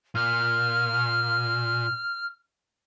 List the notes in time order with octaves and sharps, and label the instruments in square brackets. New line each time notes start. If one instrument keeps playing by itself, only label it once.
[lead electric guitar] A#2 [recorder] F6